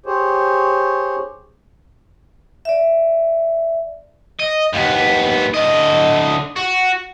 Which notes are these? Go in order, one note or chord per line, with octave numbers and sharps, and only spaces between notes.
G4 G#4 C5 C#5
D5 E5
D#5
D#2 B3
D3 D#5
F#4